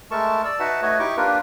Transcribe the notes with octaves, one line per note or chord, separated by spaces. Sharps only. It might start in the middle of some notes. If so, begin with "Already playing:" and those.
G#3 A3 A4 A#4 A5 C#6
D5 E6
D#4 F#4 B4 E5 F#5 A5
A3 F#4 B4 C#5 D#5
D#4 E4 G4 C#6 D6
A#3 D4 F4 G4 A#4 B4